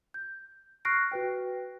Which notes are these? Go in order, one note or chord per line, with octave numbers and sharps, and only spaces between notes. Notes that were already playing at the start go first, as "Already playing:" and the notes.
G6
C#6 F6 F#6 A#6 C7 D7
F#4 B4 G5